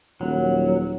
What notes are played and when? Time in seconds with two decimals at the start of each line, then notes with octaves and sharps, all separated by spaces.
0.21 D#1 F#3